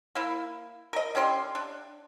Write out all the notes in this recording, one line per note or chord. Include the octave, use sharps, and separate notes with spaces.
A#3 E4
A#4 D#5
D3 C#4 G4 C6
D4